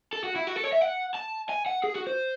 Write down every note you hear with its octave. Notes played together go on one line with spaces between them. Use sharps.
A4
F#4
E4
F#4
A4
C#5
E5
F#5
A5
G#5
F#5
G#4
F#4
C5